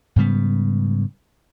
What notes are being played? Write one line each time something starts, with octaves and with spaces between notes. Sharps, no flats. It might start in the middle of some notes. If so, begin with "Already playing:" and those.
G#2 C#3 G3 B3